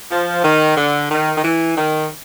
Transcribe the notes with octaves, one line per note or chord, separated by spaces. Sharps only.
F3
D#3
D3
D#3
D#3
E3
D#3